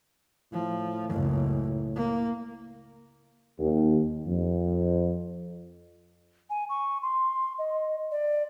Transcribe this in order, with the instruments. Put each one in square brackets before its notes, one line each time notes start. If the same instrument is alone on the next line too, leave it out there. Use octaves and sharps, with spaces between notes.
[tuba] A2 [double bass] F3
[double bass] F#1 C#2
A#3
[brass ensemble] D#2
F2
[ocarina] G#5
C#6
C6
D#5
D5